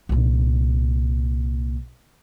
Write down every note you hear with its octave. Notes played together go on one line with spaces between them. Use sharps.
C2 A#2